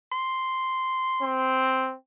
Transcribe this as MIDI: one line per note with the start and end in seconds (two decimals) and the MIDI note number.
0.12 1.51 84
1.22 1.94 60